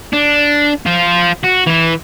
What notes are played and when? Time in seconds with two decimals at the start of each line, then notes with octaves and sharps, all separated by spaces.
0.13 D4
0.86 F4 C5
1.44 F#4
1.67 E3 E4